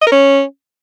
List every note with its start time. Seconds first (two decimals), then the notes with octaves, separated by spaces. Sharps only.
0.02 D#5
0.07 A#4
0.12 C#4